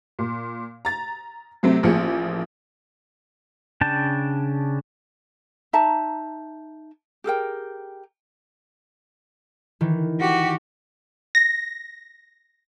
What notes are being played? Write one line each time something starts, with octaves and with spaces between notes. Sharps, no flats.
A#2
A#5 A6
C3 F#3 A3 C4
A1 F3 A#3 G#4 C#7
C#3 D4 G5 A5
D#4 E5 A5 A#5
G4 G#4 A#4 G5
D#3 E3
F#4 G4
A#6